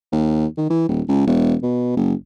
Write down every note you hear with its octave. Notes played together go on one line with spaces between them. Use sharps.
D#2
D#3
E3
D#1
C#2
E1
B2
F#1